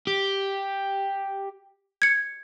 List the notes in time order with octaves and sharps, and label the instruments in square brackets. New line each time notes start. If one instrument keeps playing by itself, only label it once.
[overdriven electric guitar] G4
[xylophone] G#6 C#7